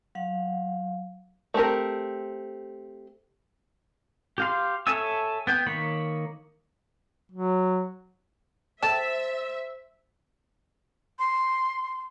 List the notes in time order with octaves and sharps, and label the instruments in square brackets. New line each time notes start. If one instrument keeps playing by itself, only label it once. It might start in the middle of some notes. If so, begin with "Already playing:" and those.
[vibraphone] F#3 F5 F#5
[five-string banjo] A3 C4 G4 A#4
[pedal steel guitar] G4 F5 C6
A4 C#5 E5 G#5 E6
B3 G5
D#3 A#3 C#5 B5
[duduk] F#3
[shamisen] A4 G5 A5 [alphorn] C5 [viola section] E5 [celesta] A6 E7
[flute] C6